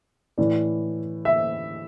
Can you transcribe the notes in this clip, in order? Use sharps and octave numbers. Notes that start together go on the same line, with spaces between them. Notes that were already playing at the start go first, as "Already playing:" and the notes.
A2 E3 D5
E5